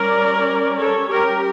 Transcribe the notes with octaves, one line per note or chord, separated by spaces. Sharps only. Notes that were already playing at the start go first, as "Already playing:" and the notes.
Already playing: G3 C#4 A#4 D5
A4 C#5
G4 A#4